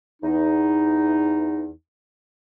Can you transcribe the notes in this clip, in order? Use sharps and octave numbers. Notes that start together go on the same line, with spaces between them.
E2 D#4